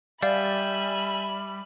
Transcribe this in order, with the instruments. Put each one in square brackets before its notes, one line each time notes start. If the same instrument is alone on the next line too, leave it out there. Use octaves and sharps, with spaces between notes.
[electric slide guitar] G3 [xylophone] D5 F5 [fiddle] E5 G#5 [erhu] B5